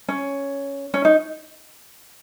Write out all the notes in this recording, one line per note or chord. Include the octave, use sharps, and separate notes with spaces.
C#4
C#4
D#4